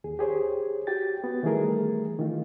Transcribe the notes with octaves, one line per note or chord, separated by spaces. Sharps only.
D#2 G#4
G4 G#4 C5 C#5
F#4 G4 G5 A6
B3 F#4
D#3 E3 G3 A3 G#4 A#4
D#3 E3 A3 F4